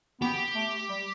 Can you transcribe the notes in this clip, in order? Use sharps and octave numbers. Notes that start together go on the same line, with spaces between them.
B3 G4
A3
G3